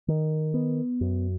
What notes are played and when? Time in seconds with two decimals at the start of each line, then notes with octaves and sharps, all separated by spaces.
0.08 D#3
0.54 B3
1.01 F#2